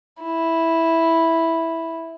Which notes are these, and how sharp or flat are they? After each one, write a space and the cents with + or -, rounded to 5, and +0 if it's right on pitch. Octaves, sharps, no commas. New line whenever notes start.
E4 -5